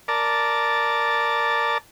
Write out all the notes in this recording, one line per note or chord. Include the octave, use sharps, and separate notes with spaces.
A#4 D5 A5